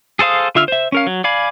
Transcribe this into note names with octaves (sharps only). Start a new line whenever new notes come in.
G#4 A4 C5 F5 D#6
D3 F4 E5 E6 F6
C5 E5
C#4 A#4 F5
F#3
D5 F5 G#5 B5